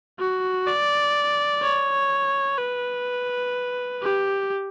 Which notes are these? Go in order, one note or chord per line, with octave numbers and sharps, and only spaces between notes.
F#4
D5
C#5
B4
G4